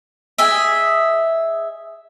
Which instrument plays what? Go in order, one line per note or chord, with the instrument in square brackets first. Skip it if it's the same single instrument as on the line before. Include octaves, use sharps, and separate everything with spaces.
[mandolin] G#4 D#5 E5